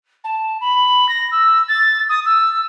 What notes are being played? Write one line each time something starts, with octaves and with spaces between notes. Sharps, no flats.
A5
B5
A#6
E6
A6
D#6
E6